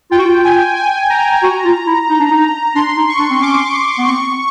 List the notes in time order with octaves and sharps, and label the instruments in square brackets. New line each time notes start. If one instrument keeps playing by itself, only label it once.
[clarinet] F4 [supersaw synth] G5
[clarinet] F#4
F4
[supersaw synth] G#5
G#5
A#5
[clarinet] F#4
F4
E4
D#4
D4
D#4
[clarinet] D4 [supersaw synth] C6
[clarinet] D#4
[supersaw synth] C#6
[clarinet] D4
C4
[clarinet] C#4 [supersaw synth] D6
[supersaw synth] D6
[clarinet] B3
[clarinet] C4 [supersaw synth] C#6